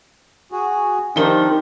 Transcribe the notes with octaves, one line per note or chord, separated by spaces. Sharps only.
F#4 G#4
D#3 F3 C4 D4 D#4 G4 G7